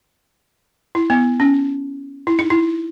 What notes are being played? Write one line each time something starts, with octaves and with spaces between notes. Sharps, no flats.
E4
B3
C#4
E4
D#4
E4